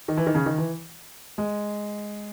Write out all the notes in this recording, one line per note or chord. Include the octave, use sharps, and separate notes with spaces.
D#3
E3
D#3
C#3
D#3
E3
G#3